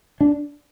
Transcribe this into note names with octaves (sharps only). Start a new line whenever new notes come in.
D4